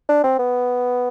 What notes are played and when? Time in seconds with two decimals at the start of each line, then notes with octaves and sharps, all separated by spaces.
0.09 D4
0.24 C4
0.39 B3